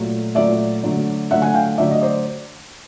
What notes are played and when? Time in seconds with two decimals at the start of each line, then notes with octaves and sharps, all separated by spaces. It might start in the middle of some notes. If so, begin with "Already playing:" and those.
Already playing: A#2 F#3 A3
0.35 A#2 F#3 A3 D5 E5
0.83 D3 F#3 A3
1.31 D3 F#3 A3 E5 F#5
1.42 F#5 G#5
1.54 F5 G5
1.78 D3 F#3 A3 D5 E5
1.91 D#5
2.02 C5 D5